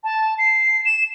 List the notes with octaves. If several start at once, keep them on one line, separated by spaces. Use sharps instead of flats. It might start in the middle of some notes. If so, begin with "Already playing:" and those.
A5
C7
E7